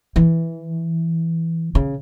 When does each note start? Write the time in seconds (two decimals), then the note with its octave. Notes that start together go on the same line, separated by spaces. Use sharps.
0.16 E3
1.75 C#3